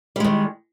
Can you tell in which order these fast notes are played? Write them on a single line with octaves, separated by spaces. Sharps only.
G3 G#3 D#3